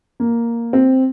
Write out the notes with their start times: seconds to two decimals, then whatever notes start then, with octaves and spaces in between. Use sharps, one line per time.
0.20 A#3
0.73 C4